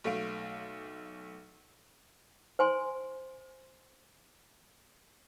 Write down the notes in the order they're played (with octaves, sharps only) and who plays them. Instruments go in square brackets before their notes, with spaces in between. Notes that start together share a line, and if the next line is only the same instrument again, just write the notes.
[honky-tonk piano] B1 A3 F5 D7
[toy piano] C5 G#5 C6